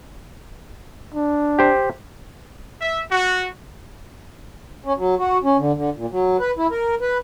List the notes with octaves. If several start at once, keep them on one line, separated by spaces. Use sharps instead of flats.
D4
G4 C5
E5
F#4
C#4
F#3
F#4
C#4
D3
D3
A#2
F#3
B4
E4
A#4
B4